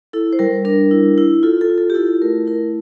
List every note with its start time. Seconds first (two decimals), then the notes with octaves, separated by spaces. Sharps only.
0.13 E4 A4
0.33 C5
0.39 G3 A#4
0.65 D4 A#4
0.91 E4
1.18 E4
1.43 F4 A4
1.61 A4
1.70 F4
1.78 A4
1.90 G4
1.95 E4 A4
2.22 A3 A#4
2.47 E4 A#4